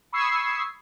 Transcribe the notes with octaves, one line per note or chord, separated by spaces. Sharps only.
B5 C#6 D#6 E6 G#6 C7